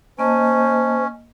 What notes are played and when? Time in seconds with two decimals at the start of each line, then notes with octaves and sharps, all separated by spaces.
0.19 A#3 C#4 C5 D#5 A5